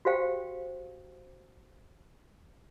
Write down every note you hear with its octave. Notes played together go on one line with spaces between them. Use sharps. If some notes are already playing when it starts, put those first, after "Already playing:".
F#4 G4 C5 F5 G5